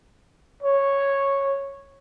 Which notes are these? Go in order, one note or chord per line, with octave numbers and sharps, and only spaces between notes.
C#5